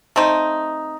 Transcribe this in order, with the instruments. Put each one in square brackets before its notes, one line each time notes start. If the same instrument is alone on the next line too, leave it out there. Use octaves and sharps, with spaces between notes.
[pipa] A3 C4 D#4